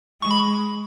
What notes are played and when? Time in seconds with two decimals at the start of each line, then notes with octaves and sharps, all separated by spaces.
0.21 G#3 C#6
0.31 B5